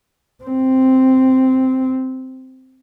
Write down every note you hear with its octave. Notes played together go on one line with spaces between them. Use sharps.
C4